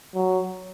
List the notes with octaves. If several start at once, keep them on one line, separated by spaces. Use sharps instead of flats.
F#3